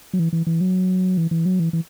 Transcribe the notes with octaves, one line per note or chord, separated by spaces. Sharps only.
F#3
E3
E3
E3
F#3
E3
E3
F#3
E3
E3